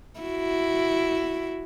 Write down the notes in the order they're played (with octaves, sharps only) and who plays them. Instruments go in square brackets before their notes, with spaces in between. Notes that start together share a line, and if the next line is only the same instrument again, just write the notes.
[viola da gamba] E4 F#4